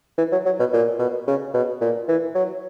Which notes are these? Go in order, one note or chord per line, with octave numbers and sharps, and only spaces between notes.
E3
F#3
F#3
B2
A#2
B2
C#3
B2
A#2
E3
F#3